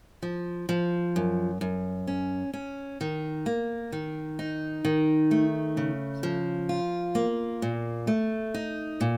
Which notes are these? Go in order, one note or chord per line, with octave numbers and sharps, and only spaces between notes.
F3
F3
F#2
F#2
C#4
C#4
D#3
A#3
D#3
D#4
D#3
A3
C#3
F3
F4
A#3
A#2
A3
D#4
A#2